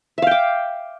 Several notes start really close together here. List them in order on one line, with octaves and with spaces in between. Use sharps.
E5 F5 G5 D6